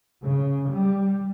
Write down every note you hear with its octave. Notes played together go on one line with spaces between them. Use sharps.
C#3
G3